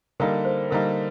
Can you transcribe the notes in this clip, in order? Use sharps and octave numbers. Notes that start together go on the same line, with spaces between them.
D3 G3 A#3 D#4 A#4
C5
D3 G3 A#3 D#4 A#4